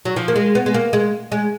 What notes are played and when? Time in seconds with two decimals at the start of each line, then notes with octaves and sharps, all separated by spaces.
0.05 F#3
0.16 F3
0.28 A#3
0.36 G#3
0.55 B3
0.66 G#3
0.74 A#3
0.93 G#3
1.32 G#3